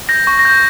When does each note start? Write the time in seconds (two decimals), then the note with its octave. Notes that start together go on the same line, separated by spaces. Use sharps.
0.09 G6 A#6
0.27 C#6 A#6
0.39 A#6
0.45 G6